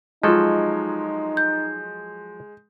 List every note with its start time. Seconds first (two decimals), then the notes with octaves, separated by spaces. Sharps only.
0.23 F3 F#3 G#3 D#4 F4 A4 D#5
1.37 G6